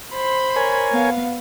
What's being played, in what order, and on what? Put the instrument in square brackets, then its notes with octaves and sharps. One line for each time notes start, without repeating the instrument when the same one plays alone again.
[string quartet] C5 B5 C6
[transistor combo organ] A#4 C#5 G#5
[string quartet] B3 F5